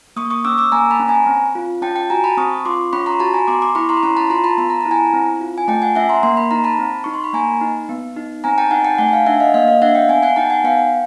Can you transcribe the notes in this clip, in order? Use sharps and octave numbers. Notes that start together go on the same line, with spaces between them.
A#3 C#6 D#6
C#6 D#6
C#4 D6 E6
D6 E6
A#3 G#5 A#5
A5 B5
C#4
G#5 A#5
C4
F4
C#4 G5 A5
G5 A5
F#4 G#5 A#5
A5 B5
C4 C#6 D#6
F4 C6 D6
C#4 B5 C#6
A#5 C6
F#4 A5 B5
G#5 A#5
B3 C6 D6
C6 D6
E4 B5 C#6
A#5 C6
B5
C#4 A#5 C6
A5 B5
F4 A#5 C6
A5 B5
B3 B5
A#5
E4 A5
G#5 A#5
C4
F4
G#5
A3 G5 A5
F#5 G#5
C#4 E5 F#5
A#5 C6
A#3 C6
B5
D#4 A#5
A5 B5
C4
D#4 C#6
C6
B5
A#3 G#5 A#5
D#4
B3
D#4
C4 G#5 A#5
G5 A5
D#4 F#5 G#5
G5 A5
A5
A3 F#5 G#5
G#5
F5 G5
D4 E5 F#5
D#5 F5
A#3 D#5 F5
D#5 F5
D4 E5 F#5
F5 G5
B3 F#5 G#5
F#5 G#5
D#4 G5 A5
F#5 G#5
B3 F5 G5